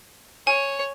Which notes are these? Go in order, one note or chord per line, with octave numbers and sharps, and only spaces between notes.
C#5 G#5